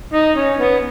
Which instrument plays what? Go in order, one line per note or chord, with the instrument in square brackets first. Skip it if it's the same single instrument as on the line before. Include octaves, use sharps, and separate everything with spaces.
[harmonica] D#4
C#4
B3